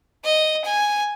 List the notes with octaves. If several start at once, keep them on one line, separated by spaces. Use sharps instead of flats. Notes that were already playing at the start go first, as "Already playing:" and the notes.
D#5
G#5